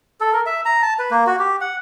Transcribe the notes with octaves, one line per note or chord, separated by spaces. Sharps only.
A4
A#4
E5
A#5
A5
B4
A#3
F#4
G4
F#5